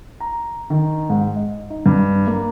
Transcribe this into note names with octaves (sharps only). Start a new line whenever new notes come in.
A#5
D#3
G#2
D#5
D#4
G2
A#3